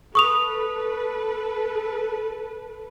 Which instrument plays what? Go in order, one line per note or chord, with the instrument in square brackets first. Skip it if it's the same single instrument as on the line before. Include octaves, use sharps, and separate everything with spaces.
[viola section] A4 B4 [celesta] C#6 D#6 F7